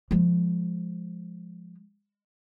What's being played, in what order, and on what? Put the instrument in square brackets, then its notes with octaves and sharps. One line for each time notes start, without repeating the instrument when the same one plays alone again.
[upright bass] F3 G#3